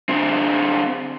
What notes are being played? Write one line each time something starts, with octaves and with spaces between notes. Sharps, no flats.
D3 C4